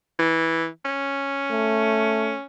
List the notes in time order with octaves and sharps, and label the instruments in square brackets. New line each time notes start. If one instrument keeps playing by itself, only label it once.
[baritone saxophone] E3
C#4
[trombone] A3